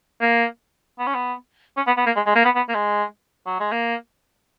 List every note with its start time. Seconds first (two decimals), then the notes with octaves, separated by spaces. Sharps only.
0.21 A#3
0.99 B3
1.07 C#4
1.14 B3
1.77 C#4
1.87 B3
1.97 B3
2.06 A#3
2.16 G#3
2.26 G#3
2.35 A#3
2.45 B3
2.56 B3
2.69 A#3
2.74 G#3
3.46 F#3
3.60 G#3
3.72 A#3